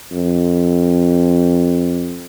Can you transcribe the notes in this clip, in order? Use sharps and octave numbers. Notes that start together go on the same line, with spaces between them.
F2